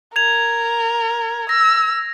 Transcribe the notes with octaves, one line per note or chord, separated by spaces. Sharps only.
A#4 G#6 F7
E6 A#6